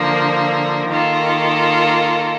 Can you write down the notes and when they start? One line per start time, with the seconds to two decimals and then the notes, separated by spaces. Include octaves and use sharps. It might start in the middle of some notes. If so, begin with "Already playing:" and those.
Already playing: D3 F3 A#3
0.88 D#3 A#3 F4 A4